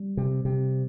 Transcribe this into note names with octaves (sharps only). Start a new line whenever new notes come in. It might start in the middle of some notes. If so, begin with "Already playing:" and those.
Already playing: G3
C3
C3